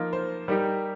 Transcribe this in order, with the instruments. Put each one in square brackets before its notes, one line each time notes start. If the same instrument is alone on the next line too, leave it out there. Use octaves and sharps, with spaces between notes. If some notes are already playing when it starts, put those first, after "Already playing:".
Already playing: [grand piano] F3 A#3 F4 [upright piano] D#4
[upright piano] C5
[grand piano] G3 D#4 G4 [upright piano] A#4